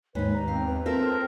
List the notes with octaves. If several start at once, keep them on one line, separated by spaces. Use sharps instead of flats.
D#2 G#2 D#4 B4 C#5
A#5
B3 C4 F5
B4
C4 F4 A4 A#4 E5